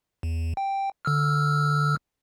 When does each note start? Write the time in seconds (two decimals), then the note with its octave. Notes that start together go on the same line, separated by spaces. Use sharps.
0.23 E2
0.57 G5
1.05 D3 E6 F6